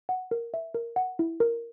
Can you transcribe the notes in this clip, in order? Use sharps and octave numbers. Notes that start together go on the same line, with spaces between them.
F#5
A#4
E5
A#4
F#5
E4
A#4